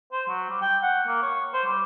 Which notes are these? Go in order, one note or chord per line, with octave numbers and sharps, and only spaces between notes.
C5
F#3
G3
G5
F#5
A#3
C#5
C5
G3